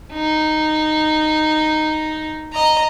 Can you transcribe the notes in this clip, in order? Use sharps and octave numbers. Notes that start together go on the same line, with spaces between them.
D#4
D#5 A#5